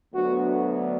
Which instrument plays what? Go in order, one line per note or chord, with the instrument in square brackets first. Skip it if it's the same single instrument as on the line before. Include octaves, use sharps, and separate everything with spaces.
[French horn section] D2 D3 F#3 B3 F#4